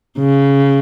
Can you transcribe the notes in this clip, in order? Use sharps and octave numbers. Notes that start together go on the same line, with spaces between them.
C#3